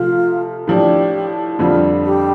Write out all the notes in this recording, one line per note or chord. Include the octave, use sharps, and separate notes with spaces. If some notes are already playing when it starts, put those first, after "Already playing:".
Already playing: C3 F3 A3 F4
A2 F3 D4 G4
F2 D3 G3 C4 F4
G4